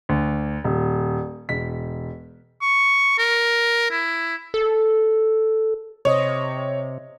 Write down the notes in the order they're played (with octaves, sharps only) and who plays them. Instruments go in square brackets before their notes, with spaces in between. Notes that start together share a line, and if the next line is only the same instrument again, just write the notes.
[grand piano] D2
D#1
E1 B6
[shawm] C#6
A#4
E4
[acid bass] A4
[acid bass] C3 [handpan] C5 D#5 [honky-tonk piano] C#5